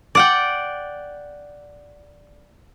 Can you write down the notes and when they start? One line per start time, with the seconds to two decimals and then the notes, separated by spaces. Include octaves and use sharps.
0.15 D5 F#5 G5